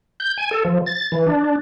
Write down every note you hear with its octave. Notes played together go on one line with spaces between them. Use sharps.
G6
G#5
A4
F3
A6
E3
D4